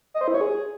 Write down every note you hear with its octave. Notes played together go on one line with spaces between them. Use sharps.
D#5
C5
E4
C#5
G#4